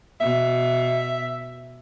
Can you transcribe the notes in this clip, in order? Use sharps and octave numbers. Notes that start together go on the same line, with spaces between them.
B2 E5